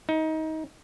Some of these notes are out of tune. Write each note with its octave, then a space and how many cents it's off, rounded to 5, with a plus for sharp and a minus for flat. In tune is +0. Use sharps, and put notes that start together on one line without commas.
D#4 +25